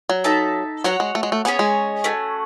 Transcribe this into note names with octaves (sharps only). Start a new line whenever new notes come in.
F#3
D#4 A4 E5 A5
F#3 F#4 C#5 F#5
G#3
A3
G#3
A3
B3 C#4 G#4 C#5 G#5
G#3
A3 C#4 F#4